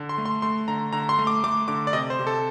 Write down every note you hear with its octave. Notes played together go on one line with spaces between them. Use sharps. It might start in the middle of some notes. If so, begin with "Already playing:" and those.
Already playing: D3
C6
A3
C6
A3 C6
D3 A#5
D3 A#5
C6
A3
D6
A3 D6
D3 D6
D5
C3 D#5
C5
C3
A4